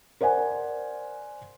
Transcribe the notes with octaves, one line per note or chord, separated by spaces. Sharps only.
A#4 C5 D5 F#5 G#5